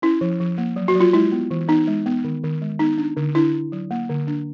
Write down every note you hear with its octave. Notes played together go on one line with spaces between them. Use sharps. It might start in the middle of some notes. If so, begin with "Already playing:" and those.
C#4 E4
F3
F3
A#3
F#3
F#4
F#3
F4
G#3 E4
B3
E3
B3 D#4
G#3
B3
D#3
D#3
G#3
B3 D#4
D4
D3
D4 E4
D4
F#3
A#3
D3
D4